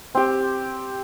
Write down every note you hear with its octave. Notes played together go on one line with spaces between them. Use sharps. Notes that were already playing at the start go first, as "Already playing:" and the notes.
C4 G4